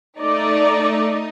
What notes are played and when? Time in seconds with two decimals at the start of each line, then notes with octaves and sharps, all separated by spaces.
0.20 A3 D#4 D5